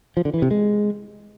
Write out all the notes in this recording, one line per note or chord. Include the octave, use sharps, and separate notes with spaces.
F3
D3
E3
C3
G#3